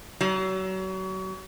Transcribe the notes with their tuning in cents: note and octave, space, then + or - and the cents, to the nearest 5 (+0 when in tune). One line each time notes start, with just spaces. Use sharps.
F#3 +35